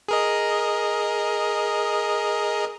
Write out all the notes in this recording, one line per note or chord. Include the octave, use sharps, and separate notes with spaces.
G#4 A#4 D#5